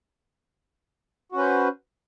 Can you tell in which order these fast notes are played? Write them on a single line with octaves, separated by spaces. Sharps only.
F#4 C#4 B4 C5